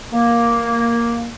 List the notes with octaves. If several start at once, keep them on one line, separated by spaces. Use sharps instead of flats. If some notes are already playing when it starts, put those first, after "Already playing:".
A#3